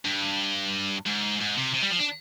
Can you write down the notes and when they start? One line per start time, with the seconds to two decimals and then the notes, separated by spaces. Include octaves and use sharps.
0.05 G2
1.06 G#2
1.40 G#2
1.57 C3
1.74 C3
1.82 G3
1.90 F3
1.99 D4